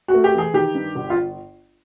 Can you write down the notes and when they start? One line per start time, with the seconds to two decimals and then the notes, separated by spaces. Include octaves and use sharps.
0.08 F#4
0.14 A3
0.24 G4
0.34 E3 G#4
0.54 D#3 G4
0.75 G2
0.95 G1
1.10 F4